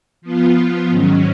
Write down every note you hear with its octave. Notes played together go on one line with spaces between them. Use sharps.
F3 B3 F4
G#2 D#3 F#3 C#4